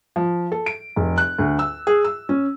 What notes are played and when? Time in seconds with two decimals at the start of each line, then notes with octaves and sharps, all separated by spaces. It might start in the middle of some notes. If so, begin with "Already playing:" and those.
0.16 F3
0.52 A4
0.66 D7
0.96 F1
1.18 F#6
1.39 D2
1.59 E6
1.87 G#4
2.04 E6
2.29 C#4